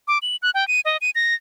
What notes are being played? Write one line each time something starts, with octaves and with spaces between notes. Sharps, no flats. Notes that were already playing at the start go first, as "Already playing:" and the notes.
D6
F#7
F#6
G5
D#7
D#5
D#7
A#6